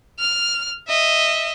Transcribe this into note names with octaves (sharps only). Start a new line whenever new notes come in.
F6
D#5 E5